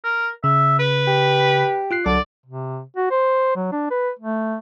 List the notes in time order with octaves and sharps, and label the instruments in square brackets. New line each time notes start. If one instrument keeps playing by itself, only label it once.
[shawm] A#4
[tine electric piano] C#3 [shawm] E5
[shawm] B4
[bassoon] G4
[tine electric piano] F4 F#6 C7
[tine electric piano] C2 F#3 A5 [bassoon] D3 [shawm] D5
[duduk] C3
F#4
C5
F#3
D4
B4
A3